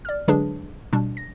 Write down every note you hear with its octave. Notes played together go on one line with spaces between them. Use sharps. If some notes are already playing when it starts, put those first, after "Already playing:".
D5 F6
D3 F#3 G#3 D4 G#4 B4
B2 G3 D4
A#6